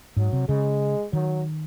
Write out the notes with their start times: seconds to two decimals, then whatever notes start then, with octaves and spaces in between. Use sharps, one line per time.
0.17 G#2 F#3
0.33 C3
0.48 C#3 G#3
1.13 D#3 F#3